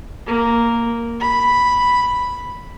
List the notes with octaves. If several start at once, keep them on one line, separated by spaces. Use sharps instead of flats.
A#3
B5